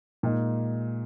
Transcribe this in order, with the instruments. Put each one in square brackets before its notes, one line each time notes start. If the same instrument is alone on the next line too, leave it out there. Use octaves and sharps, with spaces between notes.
[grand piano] A#2 G#3 D#4